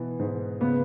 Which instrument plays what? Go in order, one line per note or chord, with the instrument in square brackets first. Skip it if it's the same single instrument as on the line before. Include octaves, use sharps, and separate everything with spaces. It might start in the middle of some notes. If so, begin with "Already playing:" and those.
Already playing: [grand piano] B2 E3
G#2
[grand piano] C#3 [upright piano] B3